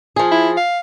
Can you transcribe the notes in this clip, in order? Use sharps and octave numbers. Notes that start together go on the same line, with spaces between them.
F3 G#4
E4
F5